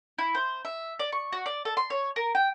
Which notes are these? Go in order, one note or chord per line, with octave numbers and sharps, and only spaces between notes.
E4
C5
E5
D5
C#6
F#4
D5
A4
C6
C#5
A#4
G5